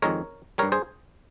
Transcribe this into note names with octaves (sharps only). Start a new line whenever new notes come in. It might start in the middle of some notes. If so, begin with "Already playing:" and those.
F2 D#3 G#3 A#4 C#5
G2 G3 A#4 C#5
G#4 C5